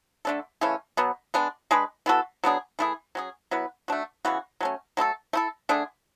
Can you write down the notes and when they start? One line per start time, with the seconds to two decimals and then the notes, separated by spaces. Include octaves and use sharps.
0.25 D3 A3 D4 A4
0.61 C#3 E3 A3 C#4
0.97 B2 F#3 B3
1.34 G#3 B3 D4
1.71 G#3 D4 G#4 B4
2.06 E3 B3 F#4 A4
2.44 F#3 B3 D4 G#4
2.79 E3 A3 E4 G#4
3.15 F#3 C#4 G#4
3.51 F#3 B3 E4 B4
3.88 A3 D4 F#4
4.25 C#3 E3 B3 F#4
4.61 F#3 A3 C#4
4.97 F#3 A3 E4 A4
5.33 A3 E4 A4
5.69 D3 A3 D4 G#4